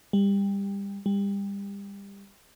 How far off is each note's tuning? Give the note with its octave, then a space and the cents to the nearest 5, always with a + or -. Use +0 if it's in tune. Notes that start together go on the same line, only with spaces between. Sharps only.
G3 +25
G3 +30